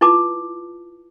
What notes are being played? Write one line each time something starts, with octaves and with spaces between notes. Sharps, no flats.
E4 F4 B4 A5 D6